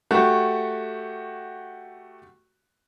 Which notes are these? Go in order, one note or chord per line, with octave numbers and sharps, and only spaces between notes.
A3 F#4 G4